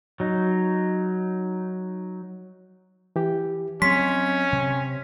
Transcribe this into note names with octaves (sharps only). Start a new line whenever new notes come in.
F#3 D#4
E3 G4
F#3 C4 C#4 C6 B6
C3